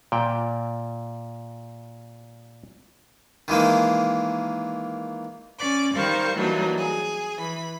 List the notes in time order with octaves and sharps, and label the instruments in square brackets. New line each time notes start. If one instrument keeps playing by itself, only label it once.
[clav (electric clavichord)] A#2 G5
[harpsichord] D#3 E3 G#3 A#3
[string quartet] C#4 D5 D6
D#3 G3 A#4 C5 F5 C#6
E3 F#3 G3 A#3 D4 D#4
G#4
E3 B5